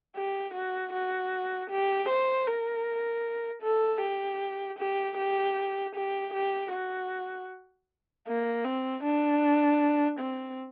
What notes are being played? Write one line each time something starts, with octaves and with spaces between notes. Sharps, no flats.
G4
F#4
F#4
G4
C5
A#4
A4
G4
G4
G4
G4
G4
F#4
A#3
C4
D4
C4